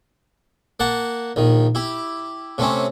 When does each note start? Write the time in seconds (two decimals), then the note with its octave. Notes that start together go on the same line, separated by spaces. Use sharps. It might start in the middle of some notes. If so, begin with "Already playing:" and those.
0.80 A#3 F#5 A5
1.36 A#1 D#3
1.75 E4 G4
2.58 C3 A3 C4 C#4